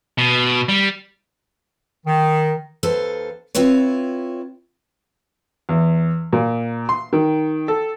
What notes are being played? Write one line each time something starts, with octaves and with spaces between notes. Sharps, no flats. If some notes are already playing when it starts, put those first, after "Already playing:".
B2
G3
D#3
D#2 A4 B4 C5 F5
C4 E4 F4 B4 C#5
E2
A#2
C6
D#3
A4